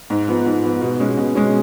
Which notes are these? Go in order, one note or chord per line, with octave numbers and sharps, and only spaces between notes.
G#2
F3 B3
G#2
F3 B3
B2
G#3 C#4
B2
G#3 C#4